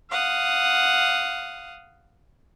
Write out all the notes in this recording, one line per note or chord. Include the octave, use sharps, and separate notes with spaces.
F5 F#5 D#6